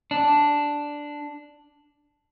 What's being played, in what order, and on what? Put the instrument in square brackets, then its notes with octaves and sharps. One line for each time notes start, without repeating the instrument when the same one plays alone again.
[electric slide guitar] D4